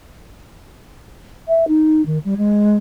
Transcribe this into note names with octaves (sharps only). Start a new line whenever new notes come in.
E5
D#4
D#3
G3
G#3